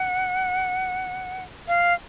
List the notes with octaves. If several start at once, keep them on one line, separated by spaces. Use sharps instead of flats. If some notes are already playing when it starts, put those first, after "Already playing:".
Already playing: F#5
F5